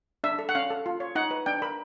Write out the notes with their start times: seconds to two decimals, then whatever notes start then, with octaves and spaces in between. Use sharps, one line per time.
0.24 D4 E5
0.39 A4
0.49 F#5
0.55 C#4 F5
0.70 A4
0.86 F4
1.00 C#5
1.15 D#4 F#5
1.31 B4
1.46 D4 G5
1.62 A#4 B5